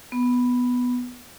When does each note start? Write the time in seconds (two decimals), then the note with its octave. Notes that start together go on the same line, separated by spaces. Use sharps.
0.12 B3